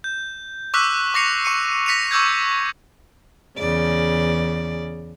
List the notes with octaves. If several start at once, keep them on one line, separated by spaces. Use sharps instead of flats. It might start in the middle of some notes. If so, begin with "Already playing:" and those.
G6
C#6 D6 E6 F#6 B6
C#6 D6 A#6 C7 C#7 F7
C#6 C#7 D#7
A#6 B6 C#7 D#7 F7
C#6 D6 E6 G6 G#6
E2 C#3 D5